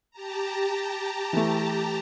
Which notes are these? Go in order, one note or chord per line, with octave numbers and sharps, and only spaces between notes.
G4 A5 A#5
E3 A3